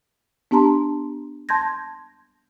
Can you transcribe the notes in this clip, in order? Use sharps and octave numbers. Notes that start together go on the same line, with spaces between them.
B3 D4 G4 A5 A#5 C6
A5 C6 G6 G#6 A#6